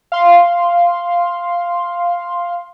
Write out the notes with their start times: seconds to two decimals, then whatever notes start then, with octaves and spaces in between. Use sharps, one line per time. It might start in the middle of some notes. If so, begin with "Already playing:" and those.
0.12 F5 C6